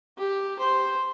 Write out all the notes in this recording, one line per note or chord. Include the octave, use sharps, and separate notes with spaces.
G4
C5